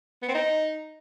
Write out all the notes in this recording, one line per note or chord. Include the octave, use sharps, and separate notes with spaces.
B3
C4
D#4